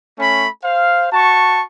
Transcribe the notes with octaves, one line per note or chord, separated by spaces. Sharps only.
A3 C#4 B5
C5 F5
F#4 A5 C#6